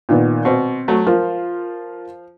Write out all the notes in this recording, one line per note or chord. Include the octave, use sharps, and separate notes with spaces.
A#2 D#3 B3
B2 C4 C5
F#3 A3
F3 F4 A#4 F5